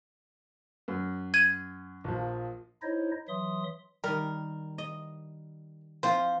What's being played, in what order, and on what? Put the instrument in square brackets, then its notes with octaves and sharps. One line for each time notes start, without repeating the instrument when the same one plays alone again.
[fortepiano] F#2
[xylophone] G#6 D#7
[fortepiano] A#1 F3
[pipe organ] D#4 E4 C5 C#5 D#5
E3 F#3 E5 C6 D#6
[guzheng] D#3 G3 [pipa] A#4
[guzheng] D#5
[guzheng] F3 C4 F4 [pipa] C5